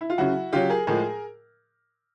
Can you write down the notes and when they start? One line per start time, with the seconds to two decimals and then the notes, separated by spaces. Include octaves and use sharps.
0.01 E4
0.10 F4
0.18 C#3 F#3 E4 F#4
0.52 C#3 F#3 F4 G4
0.69 G#4 A#4
0.87 A2 F3 G#3 G#4 A#4